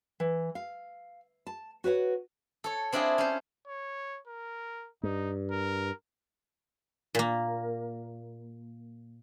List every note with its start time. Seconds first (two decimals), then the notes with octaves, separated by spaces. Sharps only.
0.20 E3
0.55 F5
1.47 A5
1.84 F#4 B4 C#5 F#5
2.64 A4 C#5
2.92 C4 D4 E4 F4 G#4
3.18 C#4 C5
3.67 C#5
4.27 A#4
5.03 G2 D#4
5.51 A#4
7.15 A#2 A#3